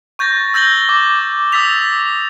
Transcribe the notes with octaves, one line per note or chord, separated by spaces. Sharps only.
C#6 G6 A6 A#6
E6 G6 A#6 F#7 G7
D6
D#6 E6 A6 B6 F7